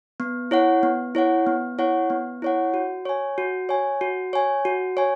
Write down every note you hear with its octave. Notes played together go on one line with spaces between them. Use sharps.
B3
E4 C#5 F#5
B3
E4 C#5 F#5
B3
E4 C#5 F#5
B3
E4 C#5 F#5
F#4
C#5 G#5
F#4
C#5 G#5
F#4
C#5 G#5
F#4
C#5 G#5